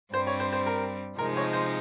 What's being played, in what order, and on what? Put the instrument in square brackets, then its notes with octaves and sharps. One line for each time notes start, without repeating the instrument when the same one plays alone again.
[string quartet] G2 G3 C4 [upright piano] C5
[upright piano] C#5
C5
C5
A#4
[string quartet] C3 F3 G#3 D#4 [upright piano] A#4
[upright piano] C#5
C5